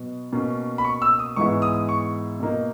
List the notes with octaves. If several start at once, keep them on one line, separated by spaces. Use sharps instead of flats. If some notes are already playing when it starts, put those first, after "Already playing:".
Already playing: B2 F#3 B3
B2 A#3 C#4
B5
C#6
E6
D#6
G#2 E3 G#3 B3 E4 C#6
D#6
C#6
B2 A#3 D#4